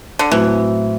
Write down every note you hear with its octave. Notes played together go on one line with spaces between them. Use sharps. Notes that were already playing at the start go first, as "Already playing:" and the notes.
D3
A2 E3 F#3 C4